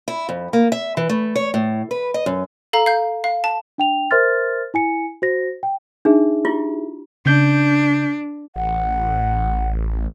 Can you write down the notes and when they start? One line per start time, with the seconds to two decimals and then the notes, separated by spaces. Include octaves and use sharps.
0.08 E4
0.29 F2
0.53 A#3
0.72 E5
0.97 E3
1.09 A3
1.35 C#5
1.54 A2
1.91 B4
2.14 D#5
2.26 F#2
2.73 A4 F5 A#5
2.86 F5 G6
3.24 F5
3.44 A5
3.78 D4 G5 F7
4.11 A#4 C5 E5 C6 F6 A6
4.74 E4 G#5 C#7
5.22 F#4 C5 A#6
5.63 G5
6.05 D4 D#4 G#4 E5
6.45 E4 F4 G4
7.26 C#3 D4 G6
8.56 A1 F#5